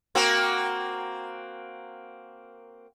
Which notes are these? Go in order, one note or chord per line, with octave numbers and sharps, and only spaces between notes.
A#3 C4 F#4